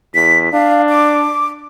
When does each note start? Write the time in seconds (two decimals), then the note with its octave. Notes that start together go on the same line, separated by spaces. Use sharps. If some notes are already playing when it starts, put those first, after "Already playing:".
0.15 E2 B6
0.53 D4 F5
0.89 D6